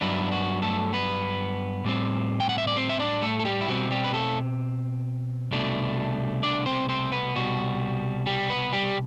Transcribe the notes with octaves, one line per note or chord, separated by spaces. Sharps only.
G2 F#3 B3 D4 E4
F#4
A3 A4
B3 B4
A2 G3 C4
G5
F#5
E5
D5
C4 C5
E5
D4 D5
A3 A4
A4
G3 G4
E4
B2 G3 C4 F#4
G3 G4
B4
A3 A4
C2 B2 A3 D4
D4 D5
C4 C5
C4 C5
B3 B4
C2 B2 G3 F#4
G3 G4
B3 B4
G3 G4